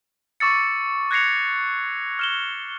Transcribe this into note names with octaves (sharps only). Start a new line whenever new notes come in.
C#6 D6 E6 A6 C#7
F#6 G#6 A#6 C7 C#7 F7
F6 E7 G7